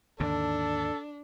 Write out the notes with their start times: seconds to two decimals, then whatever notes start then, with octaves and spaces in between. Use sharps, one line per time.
0.20 D#2 G#2 D3 D4 A4